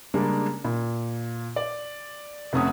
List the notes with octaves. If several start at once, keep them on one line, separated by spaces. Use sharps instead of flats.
C#3 G3 G#3 A#3 D4
A#2
D5
F1 C3 A3 C#4 F#5 D#6